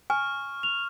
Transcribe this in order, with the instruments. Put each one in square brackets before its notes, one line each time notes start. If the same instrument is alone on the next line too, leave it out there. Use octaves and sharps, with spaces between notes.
[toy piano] G#5 [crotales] C#6 F6
[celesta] F7